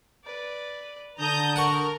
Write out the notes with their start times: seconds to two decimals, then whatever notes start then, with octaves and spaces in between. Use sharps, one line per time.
0.24 B4 D5
1.19 D3 A5 A#5 D#6 G6
1.56 A#4 F#5 C#6